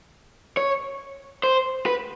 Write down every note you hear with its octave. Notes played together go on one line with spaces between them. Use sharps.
C#5
C5
B4